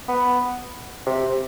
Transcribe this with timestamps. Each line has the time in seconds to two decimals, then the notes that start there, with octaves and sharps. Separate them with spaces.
0.08 B3
1.06 C3